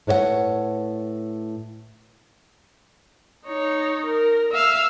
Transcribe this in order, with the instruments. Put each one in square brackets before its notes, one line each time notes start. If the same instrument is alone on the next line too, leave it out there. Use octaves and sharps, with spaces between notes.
[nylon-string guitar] A2 B4 C#5 E5 F#5
[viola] D#4 C#5
A#4
E5 F5